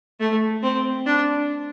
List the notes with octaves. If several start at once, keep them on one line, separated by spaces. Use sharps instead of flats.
A3
C4
D4